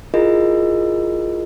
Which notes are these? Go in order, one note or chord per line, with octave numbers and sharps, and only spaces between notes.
E4 F4 G#4 A#4 D#5